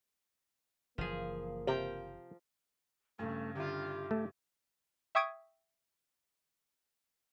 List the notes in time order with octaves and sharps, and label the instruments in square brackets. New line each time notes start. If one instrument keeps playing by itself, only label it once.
[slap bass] F#1 E3 [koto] F3 G#4 [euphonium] A#3
[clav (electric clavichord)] C3 [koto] F3 G5 A#5
[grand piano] G2 C#3 [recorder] A3
[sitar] D3 E4 F4 [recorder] G4
[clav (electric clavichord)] A3
[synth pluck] E5 G5 C#6 D#6 G#6 D7